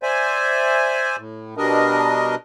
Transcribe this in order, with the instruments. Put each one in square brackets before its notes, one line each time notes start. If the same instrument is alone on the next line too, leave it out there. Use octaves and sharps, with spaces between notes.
[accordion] C5 D5 E5 G#5
A2
B2 G3 D4 A#4 D#5